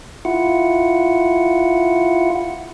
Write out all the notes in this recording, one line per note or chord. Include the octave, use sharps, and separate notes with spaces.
E4 F4 F#5